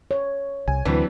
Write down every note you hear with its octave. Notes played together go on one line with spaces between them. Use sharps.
C#5
C2 G#5
D2 E3 F#3 C4 D4